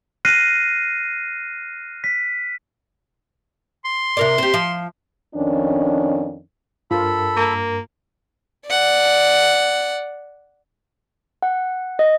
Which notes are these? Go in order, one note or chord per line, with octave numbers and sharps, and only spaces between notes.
F6 F#6 A#6 C7 D#7
B6
C6
C3 A#4 D5
C4 G4
F3
F2 D#3 C#4 D4
G2 F4 A4 A#4 B5
A#3
D5 F#5
F#5
D#5